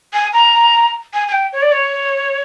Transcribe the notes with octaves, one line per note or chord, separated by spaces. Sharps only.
G#5
A#5
G#5
G#5
G5
C#5
D5
C#5